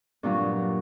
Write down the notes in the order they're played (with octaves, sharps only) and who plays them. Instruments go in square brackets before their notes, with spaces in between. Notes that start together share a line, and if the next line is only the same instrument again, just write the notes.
[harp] G2 A#2 F#3